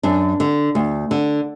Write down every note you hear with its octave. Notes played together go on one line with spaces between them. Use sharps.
F#2 D4
D3
D2
D3